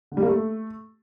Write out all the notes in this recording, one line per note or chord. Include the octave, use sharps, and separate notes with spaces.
D3
G3
A#3
A3